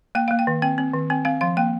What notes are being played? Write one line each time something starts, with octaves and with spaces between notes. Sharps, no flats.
A#3 G5
A#3 F5
G5
D#3
C4 G5
C4
D#3
C4 G5
C4 F5
F3 F5
A#3 G5